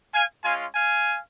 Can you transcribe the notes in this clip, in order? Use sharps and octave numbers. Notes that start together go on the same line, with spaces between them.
F5 G#5
G#3 C#4 F4 F5 G#5
F5 G#5